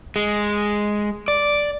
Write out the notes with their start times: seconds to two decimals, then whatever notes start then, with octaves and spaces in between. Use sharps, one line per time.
0.16 G#3
1.28 D5